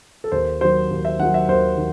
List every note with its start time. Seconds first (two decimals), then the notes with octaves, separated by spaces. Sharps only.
0.24 A4
0.32 D#2 C5
0.61 D#3 F#3 C5
0.91 D#2
1.05 E5
1.19 D#3 F#3 F#5
1.34 E5
1.48 D#2 C5
1.78 D#3